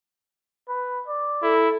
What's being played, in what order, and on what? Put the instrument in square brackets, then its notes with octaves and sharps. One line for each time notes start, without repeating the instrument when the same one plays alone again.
[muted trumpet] B4
D5
[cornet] E4 [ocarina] A4